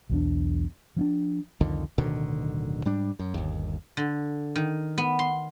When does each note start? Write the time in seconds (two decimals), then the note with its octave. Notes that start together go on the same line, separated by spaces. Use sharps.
0.09 B1 E2 D4
0.97 F3 C#4 D4
1.61 C2 F2 D3 D#3
1.98 D1 B2 D3 D#3
2.85 G#2 G3 D4
3.19 F#2
3.34 G1 D#2
3.97 D3
4.56 D#3
4.98 B3
5.19 C6